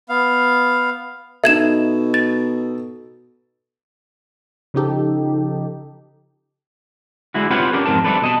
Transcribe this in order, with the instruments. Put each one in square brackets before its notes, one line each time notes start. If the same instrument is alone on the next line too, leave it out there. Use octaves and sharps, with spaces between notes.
[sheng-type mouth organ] B3 F5
[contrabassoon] B2 [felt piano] D#4 A4 [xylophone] E5 G#6 E7
[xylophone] A6
[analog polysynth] C#3 F3 D#4 G4 A4
[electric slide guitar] D3 G#3 E4 F#4
C4 F4 G4 B4 C#5 F#5
C#4 D4 G4 A#4
F2 G#2 E3 C4 A#4 A5
G3 A3 C4 D4 A4 B4
B2 D#5 A5